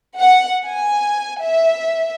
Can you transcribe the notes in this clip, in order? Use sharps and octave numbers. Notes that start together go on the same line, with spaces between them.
F#5
G#5
E5